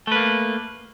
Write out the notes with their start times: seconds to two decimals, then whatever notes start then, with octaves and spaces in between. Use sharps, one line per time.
0.07 A3
0.12 B4
0.16 A#3